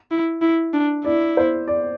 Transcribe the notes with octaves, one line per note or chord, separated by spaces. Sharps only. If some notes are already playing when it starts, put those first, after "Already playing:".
E4
E4
D4
E4 D5
C5
D5